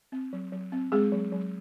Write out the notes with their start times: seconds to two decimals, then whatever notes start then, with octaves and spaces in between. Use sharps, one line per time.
0.12 C4
0.33 F#3
0.52 F#3
0.72 C4
0.92 G#3 C4 G#4
1.12 F#3
1.32 F#3